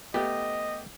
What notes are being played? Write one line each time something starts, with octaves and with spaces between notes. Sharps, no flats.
A3 B3 G4 D#5